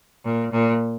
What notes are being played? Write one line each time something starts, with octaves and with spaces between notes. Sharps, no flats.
A#2
A#2